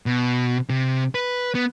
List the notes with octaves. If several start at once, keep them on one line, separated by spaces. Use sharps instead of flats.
B2
C3
B4
B3